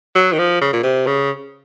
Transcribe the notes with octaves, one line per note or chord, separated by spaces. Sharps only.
F#3
D#3
F3
C#3
A#2
C3
C#3